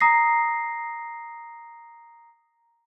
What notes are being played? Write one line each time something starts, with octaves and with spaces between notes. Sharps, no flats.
A#5 D#6 A#6 C7